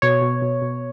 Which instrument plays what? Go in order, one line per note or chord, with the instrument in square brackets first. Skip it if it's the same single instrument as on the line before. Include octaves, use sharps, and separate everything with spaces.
[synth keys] B2 C#5
B2
B2
B2